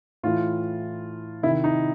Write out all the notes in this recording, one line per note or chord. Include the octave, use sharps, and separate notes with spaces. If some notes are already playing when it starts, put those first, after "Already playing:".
A2 E3 F4
C3 D#3 E4
D#4